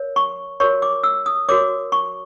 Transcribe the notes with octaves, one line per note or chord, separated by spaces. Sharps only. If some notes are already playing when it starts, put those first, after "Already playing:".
Already playing: A#4 C#5
C#6
F#4 A#4 C#5 C#6
D6
E6
D#6
F#4 A#4 C#5 D6
C#6